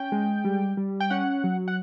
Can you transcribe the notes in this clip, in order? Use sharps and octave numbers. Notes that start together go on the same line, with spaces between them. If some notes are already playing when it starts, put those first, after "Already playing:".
Already playing: C#4 G5
G#3
G3
G3
G5
C#4 F#5
F#3
F#5